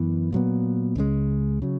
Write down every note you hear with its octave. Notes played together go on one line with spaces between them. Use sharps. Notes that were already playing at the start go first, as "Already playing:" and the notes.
Already playing: F#2 E3 B3
A#2 F#3 B3
C#2 C#3 G#3
C#3 F#3